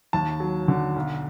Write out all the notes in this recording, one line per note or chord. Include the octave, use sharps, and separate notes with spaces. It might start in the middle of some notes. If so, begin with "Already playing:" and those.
D#2 A5
F#3
D3
B1